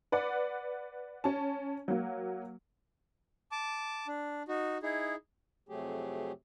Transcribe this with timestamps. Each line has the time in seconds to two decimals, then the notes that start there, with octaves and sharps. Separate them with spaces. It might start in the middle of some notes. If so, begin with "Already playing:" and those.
0.12 B4 D5 F#5
1.24 C#4 A5
1.88 F#3 A#3
3.52 A5 D6
4.08 D4
4.48 D#4 F#4
4.83 D#4 E4 G#4
5.69 F2 C3 F#3 A3 G4 G#4